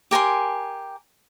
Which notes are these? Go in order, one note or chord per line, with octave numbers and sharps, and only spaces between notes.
G4 A#4 G#5 C6